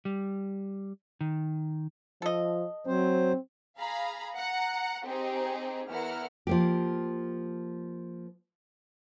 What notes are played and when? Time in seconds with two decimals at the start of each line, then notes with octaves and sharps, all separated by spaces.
0.05 G3
1.21 D#3
2.22 F3 A4 D#5
2.87 F#3 C4 C5
3.79 G#4 F5 A#5 B5
4.36 F#5 A#5
5.05 C4 D#4 G4 G#4
5.90 E2 E4 A#4 F#5 F6
6.47 F3 A#3 G4